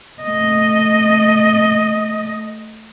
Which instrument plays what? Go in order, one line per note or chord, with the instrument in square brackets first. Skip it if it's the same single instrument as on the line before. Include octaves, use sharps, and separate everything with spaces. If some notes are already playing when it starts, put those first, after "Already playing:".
[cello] A3 D#5